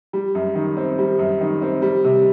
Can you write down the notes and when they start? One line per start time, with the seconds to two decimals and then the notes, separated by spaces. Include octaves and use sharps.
0.13 G3
0.35 F#2
0.55 D#3
0.77 C4
0.99 G3
1.19 F#2
1.41 D#3
1.62 C4
1.82 G3
2.04 C3